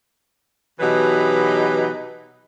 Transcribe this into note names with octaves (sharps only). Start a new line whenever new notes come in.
B2 E3 F#3 D#4 G4 B4